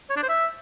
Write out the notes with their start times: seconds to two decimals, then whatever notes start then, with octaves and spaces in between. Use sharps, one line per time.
0.10 C#5
0.17 D4
0.23 C5
0.29 E5